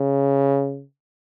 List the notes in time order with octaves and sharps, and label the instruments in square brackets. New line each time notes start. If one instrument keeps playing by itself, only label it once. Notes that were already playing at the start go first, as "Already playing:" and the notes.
Already playing: [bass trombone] C#3